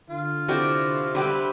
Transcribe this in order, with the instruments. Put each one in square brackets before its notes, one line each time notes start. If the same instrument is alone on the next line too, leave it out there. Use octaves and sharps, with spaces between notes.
[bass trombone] D3 [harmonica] F4
[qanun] C3 D5 G5 [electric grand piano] E4 F#4 A4
[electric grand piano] D3 [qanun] G3 G4 B4 [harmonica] C4 D5 E5